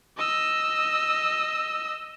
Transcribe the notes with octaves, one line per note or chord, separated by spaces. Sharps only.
D#5 E6